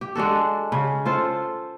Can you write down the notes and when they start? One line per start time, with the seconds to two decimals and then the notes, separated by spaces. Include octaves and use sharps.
0.01 G4
0.15 G#3 D4 F#4 A4
0.72 C#3
1.06 F4 A4 C5